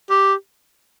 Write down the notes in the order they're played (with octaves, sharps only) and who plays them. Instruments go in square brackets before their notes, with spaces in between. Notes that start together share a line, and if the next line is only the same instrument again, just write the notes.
[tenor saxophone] G4